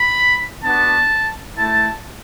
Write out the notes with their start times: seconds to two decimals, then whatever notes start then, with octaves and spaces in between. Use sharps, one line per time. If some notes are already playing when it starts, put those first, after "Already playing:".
Already playing: B5
0.63 B3 D4 F#4 A5
1.56 A3 E4 A5